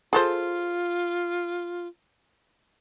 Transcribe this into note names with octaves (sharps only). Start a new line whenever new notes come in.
F4 G#4 A4 C5